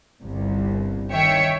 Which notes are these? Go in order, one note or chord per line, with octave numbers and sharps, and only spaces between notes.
G1 C2
D#3 C#5 E5 G5 C#7